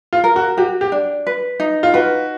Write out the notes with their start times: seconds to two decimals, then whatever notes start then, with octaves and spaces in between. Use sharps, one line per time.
0.13 F4
0.24 A#4
0.36 F#4
0.57 F#4 G4
0.81 G4
0.92 D4
1.27 B4
1.60 D#4
1.83 F4
1.94 F#4 B4